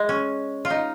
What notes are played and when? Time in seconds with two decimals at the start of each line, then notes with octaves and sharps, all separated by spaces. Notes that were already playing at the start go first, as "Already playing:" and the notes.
Already playing: G#3
0.09 C#4
0.65 F4
0.70 D#4